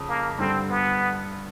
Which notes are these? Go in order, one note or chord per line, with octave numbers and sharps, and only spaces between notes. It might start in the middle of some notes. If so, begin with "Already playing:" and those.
Already playing: F2 C#3
A#3
G2 D3 G3 C4
B3